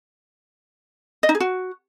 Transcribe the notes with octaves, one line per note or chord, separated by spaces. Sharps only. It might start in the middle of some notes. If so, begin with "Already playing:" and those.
D#5
D#4
G#4
F#4